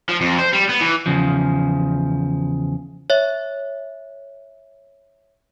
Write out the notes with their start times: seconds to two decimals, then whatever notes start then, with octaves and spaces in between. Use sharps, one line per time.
0.09 F3
0.21 F2
0.39 C5
0.53 G3
0.69 B3
0.81 E3
1.06 E2 C#3 F3
3.10 C#5 E5